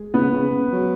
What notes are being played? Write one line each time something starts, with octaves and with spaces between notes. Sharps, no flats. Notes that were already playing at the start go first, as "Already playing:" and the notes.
Already playing: G#3 G#4
C#3 B3 B4
C#3
F#3